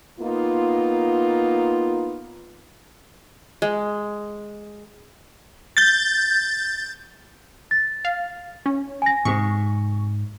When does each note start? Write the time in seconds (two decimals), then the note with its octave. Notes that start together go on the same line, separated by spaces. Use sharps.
0.20 A#3 B3 D#4 F4
3.62 G#3
5.77 G6 A6
7.71 A6
8.05 F5
8.66 C#4
9.02 G#5 A#6
9.25 G#2 C3 C#6